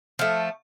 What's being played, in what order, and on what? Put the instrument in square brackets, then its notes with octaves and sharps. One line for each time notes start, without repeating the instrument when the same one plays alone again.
[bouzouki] F3 A3